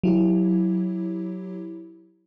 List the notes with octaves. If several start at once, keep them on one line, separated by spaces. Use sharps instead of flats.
F#3 E4 G4